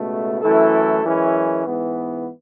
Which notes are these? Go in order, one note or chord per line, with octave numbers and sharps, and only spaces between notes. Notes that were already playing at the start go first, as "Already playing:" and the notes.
Already playing: C#2 B2 A3
F#2 E3 A3 E4 A4
F#2 E3 G#3 C#4 E4
G#2 E3 B3